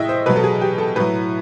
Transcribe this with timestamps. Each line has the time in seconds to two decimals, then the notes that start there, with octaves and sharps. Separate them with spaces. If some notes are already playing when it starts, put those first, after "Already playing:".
Already playing: A2 E3 G#3 D#5 E5 G5
0.09 C5
0.26 B2 F#3 B4
0.36 A4
0.44 G#4
0.61 G4
0.78 A4
0.96 A2 F#3 B4